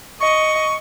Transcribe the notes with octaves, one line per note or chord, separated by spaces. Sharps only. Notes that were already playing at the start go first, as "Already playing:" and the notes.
D#5 C#6